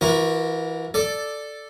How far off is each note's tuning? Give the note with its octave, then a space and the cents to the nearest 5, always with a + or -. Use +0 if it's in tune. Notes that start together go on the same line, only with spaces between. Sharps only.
E3 +0 F#4 -35 A#4 +20
A4 +0 D5 +5